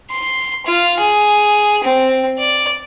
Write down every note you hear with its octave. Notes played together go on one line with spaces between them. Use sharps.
C6
F4
G#4
C4
D5